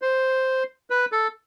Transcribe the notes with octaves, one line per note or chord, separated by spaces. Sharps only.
C5
B4
A4